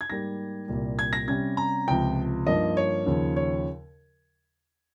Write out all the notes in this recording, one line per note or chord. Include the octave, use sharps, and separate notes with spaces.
G#6
G#2 G3 A#3 A#6
C2 A#2 G3
G#6
A#6
C3 G3 C#4 G#6
A#5
C#2 C3 F3 G5
G2 F3 A#3 D#4 D#5
C#5
D#2 C#3 F3
C#5